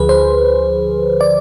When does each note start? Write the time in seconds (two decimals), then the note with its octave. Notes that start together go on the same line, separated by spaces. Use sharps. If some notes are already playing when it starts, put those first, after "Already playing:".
Already playing: D2 D3 F3 G#4 B4
0.09 C5
1.21 D5